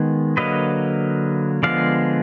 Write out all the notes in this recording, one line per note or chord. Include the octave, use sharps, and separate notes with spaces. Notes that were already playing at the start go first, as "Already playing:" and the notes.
Already playing: D#3 G#3 B3
D3 F#3 A#3 B4 D#5
D3 F3 G#3 B3 D5 F5